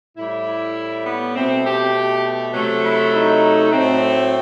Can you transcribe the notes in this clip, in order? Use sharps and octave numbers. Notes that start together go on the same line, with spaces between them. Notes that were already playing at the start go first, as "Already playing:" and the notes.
A2 G3 E4
B3
B2 A3 C4
G4
C3 F#3 A3
E4
D#4
A2 F#3 A3 C4